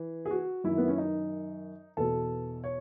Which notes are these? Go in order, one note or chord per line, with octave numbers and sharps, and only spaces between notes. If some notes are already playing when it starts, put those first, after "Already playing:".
Already playing: E3
G#4
F#4
F#2 D#3 E4
B3
C#4
D#4
E2 B2 A4
C#5